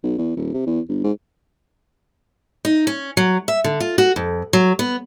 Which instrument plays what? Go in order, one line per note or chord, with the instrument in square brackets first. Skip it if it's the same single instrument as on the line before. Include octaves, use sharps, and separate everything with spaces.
[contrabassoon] B1
E2
D#1
C3
E2
G1
G#2
[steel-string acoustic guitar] D#4
C#4
F#3
E5
D3
F4
F#4
F2
F#3
B3